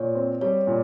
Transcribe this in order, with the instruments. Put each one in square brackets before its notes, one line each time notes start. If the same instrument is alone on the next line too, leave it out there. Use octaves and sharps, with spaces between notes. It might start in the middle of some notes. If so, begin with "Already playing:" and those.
Already playing: [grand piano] A#2 [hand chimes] C#5
[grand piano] C4
[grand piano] G3 [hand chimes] C#5
[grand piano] A#2